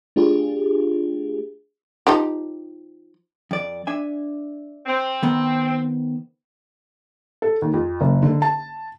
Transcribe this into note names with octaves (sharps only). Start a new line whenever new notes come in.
A3 D4 F4 G4 G#4
F3 D#4 G4
F2 D5
D4 E5 G#5
C4
D#3 B3 C5
A4
D#2
F2
F#1
D3
A5